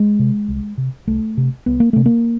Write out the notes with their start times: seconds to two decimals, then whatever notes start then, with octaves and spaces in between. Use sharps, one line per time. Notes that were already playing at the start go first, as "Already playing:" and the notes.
Already playing: G#3
0.19 C3
0.48 C2
0.78 C3
1.07 C2 A3
1.37 C3
1.66 C2 B3
1.80 A#3
1.93 C3 A3
2.06 A#3